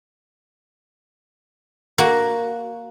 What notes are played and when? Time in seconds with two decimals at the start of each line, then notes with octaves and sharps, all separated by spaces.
1.98 A#3 F#4